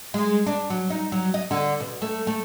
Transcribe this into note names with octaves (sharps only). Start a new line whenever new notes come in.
G#3
D4
F#3
D#4
F#3
D#5
D3
B2
A3
A3